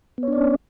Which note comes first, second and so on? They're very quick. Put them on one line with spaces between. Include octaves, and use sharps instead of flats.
B3 C#5 D4 D5 C#4